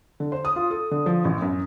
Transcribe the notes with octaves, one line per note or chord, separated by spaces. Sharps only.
D3
C5
D#6
F4
A4
D3
F3
A1
F#2